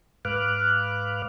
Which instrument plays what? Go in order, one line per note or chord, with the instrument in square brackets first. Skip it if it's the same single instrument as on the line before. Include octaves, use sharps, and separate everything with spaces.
[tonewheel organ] G#2 B4 F5 D6 F6 F#6